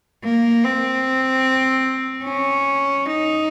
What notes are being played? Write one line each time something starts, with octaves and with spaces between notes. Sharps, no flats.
A#3
C4
C#4
D#4